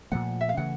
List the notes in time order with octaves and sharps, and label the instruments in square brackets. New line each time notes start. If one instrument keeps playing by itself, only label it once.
[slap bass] A#2 F3 A3 [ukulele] F#5
[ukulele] E5
F5
[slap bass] C#3 E3 A3 [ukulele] F#5